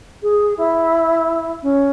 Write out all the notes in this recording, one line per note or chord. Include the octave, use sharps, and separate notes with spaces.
G#4
E4
C#4